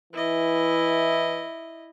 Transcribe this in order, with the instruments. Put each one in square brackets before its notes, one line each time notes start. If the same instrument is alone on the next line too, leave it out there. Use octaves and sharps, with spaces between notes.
[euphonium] E3 [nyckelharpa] E4 D#5